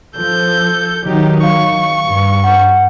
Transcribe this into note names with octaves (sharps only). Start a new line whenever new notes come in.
F3 A4 G6
D#3 F#3 D#4 G4
F5 C#6
G2
F#5